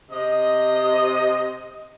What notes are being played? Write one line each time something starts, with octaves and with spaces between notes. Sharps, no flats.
C3 D#5